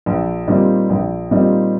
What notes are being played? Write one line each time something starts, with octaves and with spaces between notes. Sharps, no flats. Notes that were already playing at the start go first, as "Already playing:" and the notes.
A#1
A#2 G3 C4 D#4
A#1
A#2 G3 C4 D#4